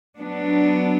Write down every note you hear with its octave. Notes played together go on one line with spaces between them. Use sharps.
F#3 B3 D4